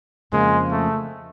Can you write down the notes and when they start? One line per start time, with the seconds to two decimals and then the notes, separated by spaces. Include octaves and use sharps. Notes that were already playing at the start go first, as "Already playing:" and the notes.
0.32 F2 C#3 F3 G#3 A#3
0.72 A3